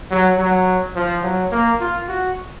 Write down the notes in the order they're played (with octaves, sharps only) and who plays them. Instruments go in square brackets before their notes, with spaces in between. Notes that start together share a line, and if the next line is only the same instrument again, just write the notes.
[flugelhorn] F#3
F#3
F3
F#3
A#3
F4
F#4